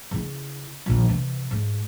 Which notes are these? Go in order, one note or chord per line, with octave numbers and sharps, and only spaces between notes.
C#3 E4
A#1 D#3
C3 E3
G#2